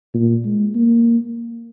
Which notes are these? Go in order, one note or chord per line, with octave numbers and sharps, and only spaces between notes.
A#2
G#3
A#3